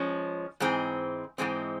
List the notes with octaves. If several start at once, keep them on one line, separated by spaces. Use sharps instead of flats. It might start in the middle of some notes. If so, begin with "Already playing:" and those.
Already playing: F3 G#3 C#4
G#2 E3 G#3 C4
G#2 E3 G#3 C4